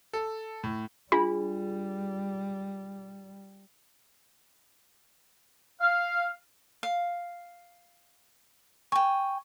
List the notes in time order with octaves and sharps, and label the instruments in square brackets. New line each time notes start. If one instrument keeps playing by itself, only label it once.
[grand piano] A4
A2
[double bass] G3 [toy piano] D4 F4 G#4 [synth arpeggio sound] B5
[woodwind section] F5
[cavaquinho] F5
[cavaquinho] G5 G#5 [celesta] C#6